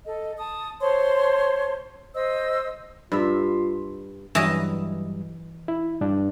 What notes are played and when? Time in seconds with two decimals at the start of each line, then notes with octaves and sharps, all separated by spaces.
0.06 A4 D#5
0.38 A5 D#6
0.81 C5 C#5 A5 C6
2.15 C5 D#5 E6
3.12 G2 F4 E5
4.35 G2 E3 F#3 G3 D#5
5.68 E4
6.01 G2 D4